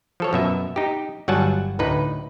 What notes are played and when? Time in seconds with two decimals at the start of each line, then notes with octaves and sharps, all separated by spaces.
0.20 F3 A4 C#5
0.33 F#2 B2 E5
0.76 D#4 G4
1.28 G1 F#3 G3 F#5 G#5 A5
1.79 D2 A2 D#4 B4